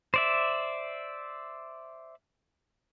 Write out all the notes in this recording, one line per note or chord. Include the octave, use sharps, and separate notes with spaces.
C5 D5 E5